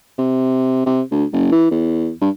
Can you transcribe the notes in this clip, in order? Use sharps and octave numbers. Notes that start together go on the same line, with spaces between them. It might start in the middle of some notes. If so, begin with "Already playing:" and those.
C3
C3
D2
F#1
E3
E2
G2